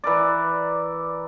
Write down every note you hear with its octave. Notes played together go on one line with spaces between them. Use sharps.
E3 A#4 D5